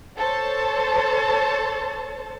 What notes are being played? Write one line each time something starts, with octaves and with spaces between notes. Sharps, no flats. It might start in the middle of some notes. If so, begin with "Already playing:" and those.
A4 C5 C#5 A5